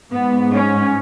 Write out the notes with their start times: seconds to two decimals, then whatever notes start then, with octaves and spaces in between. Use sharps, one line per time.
0.12 G#2 G#3 B3
0.54 C#4